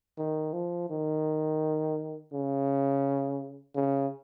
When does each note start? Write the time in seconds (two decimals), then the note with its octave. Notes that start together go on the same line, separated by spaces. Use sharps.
0.18 D#3
0.53 F3
0.89 D#3
2.33 C#3
3.75 C#3